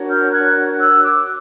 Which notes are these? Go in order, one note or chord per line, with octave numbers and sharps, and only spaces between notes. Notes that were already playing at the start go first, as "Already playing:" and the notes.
Already playing: D4 F#4 A#4 C#5
F6 G6
F#6 G#6
E6 F#6
D6 E6